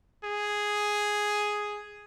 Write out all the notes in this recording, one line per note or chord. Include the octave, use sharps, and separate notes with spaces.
G#4